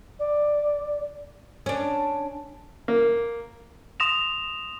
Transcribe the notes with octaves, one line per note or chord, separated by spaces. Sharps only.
D5
C#4 D4
A#3
C6 D#6 A#6 E7 F7